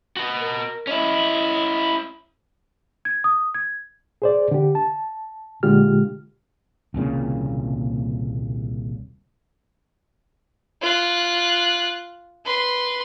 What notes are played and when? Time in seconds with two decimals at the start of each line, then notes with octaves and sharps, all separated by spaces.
0.16 F#4 D#5
0.40 A#4
0.87 C#4 E4 D#5
3.05 G#6
3.24 D#6
3.54 G#6
4.22 G#4 C5 D5
4.51 D3 G4
4.75 A5
5.63 A#2 D3 G#3 F4 G4 F6
6.94 D#1 C2 A#2 C#3
10.82 F4 F#6
12.45 B4 C6